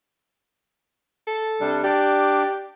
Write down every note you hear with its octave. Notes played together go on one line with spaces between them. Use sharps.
A4
C3 G3 D4
D4 G4 D5